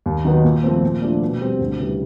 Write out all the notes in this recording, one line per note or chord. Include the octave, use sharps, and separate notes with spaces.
D#2
D#3 F#3 B3 D#4
A#2
F3 A3 C4
A#2
F3 A3 D4
B2
G3 C4
D2
C#3 E3 G3